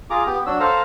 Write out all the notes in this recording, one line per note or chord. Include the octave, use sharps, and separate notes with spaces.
F4 G#4 A#5 D6
B3 G4
F#3 D4 F#4 E6
A4 C5 F5 A#5